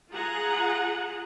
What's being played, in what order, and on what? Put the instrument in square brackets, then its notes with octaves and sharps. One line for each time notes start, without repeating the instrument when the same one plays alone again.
[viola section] F4 G#4 F#5 A#5